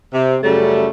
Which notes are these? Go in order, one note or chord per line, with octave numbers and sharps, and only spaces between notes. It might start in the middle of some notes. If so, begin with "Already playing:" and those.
C3
F#2 C#3 G3 A3